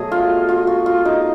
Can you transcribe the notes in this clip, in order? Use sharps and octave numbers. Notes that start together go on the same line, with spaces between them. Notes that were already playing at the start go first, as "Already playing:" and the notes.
Already playing: B2 F#3 A3 G#4
F4
F4
F#4
F4
D#4